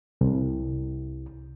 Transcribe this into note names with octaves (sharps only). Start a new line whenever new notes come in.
C2